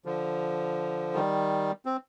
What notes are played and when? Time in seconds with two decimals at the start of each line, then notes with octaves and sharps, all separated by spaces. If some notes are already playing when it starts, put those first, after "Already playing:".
0.05 D3 F3
1.14 D#3 G3
1.86 C4